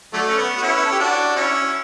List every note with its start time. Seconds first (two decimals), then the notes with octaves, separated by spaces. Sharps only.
0.13 D3 F#3 A3
0.28 C#4
0.38 B3
0.58 F#4
0.62 C#4 E4
0.76 B4
0.84 A4
0.92 G4
0.99 D4 F#4
1.36 C#4 E4